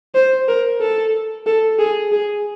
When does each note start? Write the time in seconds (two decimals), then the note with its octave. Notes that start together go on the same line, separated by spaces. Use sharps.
0.15 C5
0.48 A#4
0.81 A4
1.46 A4
1.79 G#4
2.12 G#4